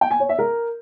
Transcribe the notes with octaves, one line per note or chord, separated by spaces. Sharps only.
G5
G#5
C#5
E5
A#4